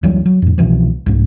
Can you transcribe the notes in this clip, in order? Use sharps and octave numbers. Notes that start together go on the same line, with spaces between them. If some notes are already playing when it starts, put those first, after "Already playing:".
D2 E3 F#3 G3
F#3
F2 A2
C2 B2 E3 F3
C2 G#2